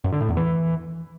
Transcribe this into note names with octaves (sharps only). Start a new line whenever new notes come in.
F#2
D3
A2
E2
E3